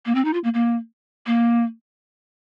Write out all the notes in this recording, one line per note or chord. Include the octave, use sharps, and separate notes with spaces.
A#3
C4
D#4
F4
A#3
A#3
A#3